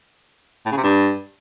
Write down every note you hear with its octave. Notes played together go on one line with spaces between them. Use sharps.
A2
C#3
C3
G2